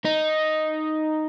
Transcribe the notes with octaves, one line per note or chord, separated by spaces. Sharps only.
D#4